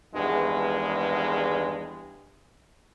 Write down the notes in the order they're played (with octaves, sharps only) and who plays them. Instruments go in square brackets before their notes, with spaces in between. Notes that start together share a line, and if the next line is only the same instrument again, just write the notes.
[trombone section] G#1 E2 G2 G#3